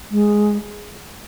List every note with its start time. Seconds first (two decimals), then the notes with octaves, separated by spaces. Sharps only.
0.11 G#3